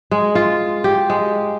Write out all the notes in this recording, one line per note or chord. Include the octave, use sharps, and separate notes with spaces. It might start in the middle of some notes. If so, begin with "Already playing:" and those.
G#3
F4
G4
G#3